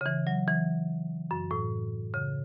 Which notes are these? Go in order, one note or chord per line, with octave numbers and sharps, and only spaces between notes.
C#3
E3
F#3
E3
F#2
A2
C#3